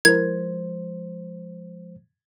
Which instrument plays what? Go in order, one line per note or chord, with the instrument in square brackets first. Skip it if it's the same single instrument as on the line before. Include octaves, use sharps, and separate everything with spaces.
[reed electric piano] F3 G#3 C5 [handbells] E4 A#4 [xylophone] G#6